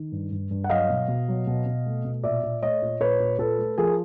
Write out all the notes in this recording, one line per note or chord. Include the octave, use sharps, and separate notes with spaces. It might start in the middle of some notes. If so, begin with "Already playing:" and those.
Already playing: D#3
G2
G2
G2
F#5
F#3 D#5 F5
B2
B2
F#3
B2
B2
A3
B2
A#2 D5 E5
A#2
A3 C#5 D#5
A#2
A#2 B4 C#5
A#2
A#2 A4 B4
A3
F3 G#4 A#4